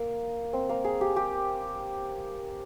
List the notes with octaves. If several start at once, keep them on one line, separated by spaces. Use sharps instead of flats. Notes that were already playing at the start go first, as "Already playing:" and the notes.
Already playing: A#3
C4
A#3
G#4
G4
G4